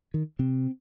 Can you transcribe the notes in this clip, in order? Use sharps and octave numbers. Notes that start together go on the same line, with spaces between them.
D#3
C3 C4